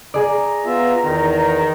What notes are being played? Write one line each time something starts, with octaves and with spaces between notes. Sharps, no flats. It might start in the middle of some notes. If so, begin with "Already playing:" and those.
G#4 D5 A#5
B3 F4 E5
E2 D#3